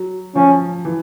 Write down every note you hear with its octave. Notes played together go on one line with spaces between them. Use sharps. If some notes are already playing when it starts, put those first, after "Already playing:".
Already playing: F#3
F3 C#4
E3